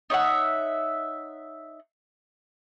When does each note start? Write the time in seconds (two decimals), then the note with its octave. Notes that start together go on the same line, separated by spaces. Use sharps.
0.10 D#4 C#5 E5 F#5